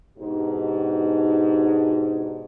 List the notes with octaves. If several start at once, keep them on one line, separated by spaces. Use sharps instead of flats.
G#2 B2 D4 D#4 F#4 G4